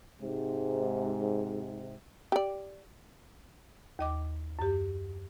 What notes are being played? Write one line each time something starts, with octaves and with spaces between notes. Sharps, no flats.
G#2 C3
G4 D5
D#2 D#5 D6
F#2 G4